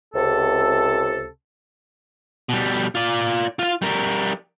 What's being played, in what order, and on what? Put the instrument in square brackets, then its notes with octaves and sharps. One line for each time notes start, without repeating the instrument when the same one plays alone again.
[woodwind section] C#2 C3 A4
[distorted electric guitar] B2 G3
F4 D5
F4 F5
G3 A#4